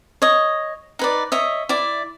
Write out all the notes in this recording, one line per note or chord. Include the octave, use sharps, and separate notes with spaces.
C#5 D#5
D#4 B4 D5
C#5 D#5 E5
E4 D5